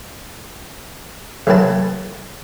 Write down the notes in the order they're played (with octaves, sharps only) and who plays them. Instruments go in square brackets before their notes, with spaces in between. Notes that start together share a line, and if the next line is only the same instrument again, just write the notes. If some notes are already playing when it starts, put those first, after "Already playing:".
[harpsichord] A1 D2 A#2 F#3 B4 A5